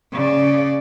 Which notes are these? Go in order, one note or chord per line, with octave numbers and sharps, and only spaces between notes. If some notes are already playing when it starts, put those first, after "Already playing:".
C#3 D5